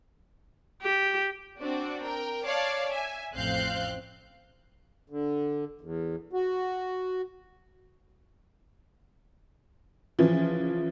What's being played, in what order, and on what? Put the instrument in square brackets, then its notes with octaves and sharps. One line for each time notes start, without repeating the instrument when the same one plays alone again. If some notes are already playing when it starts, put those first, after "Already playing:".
[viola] G4
[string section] C4 D4 F#4 D5
A#4 G5
C#5 D5 F5 A5
E5 G#5
A1 F2 C4 F5 F#6 G6
[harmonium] D3
E2
F#4
[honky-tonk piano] C#3 E3 F3